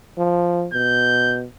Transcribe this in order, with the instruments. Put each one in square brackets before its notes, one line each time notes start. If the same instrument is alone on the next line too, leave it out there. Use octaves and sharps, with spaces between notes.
[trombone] F3
[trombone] B2 [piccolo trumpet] G6